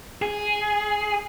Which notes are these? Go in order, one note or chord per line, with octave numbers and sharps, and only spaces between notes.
G#4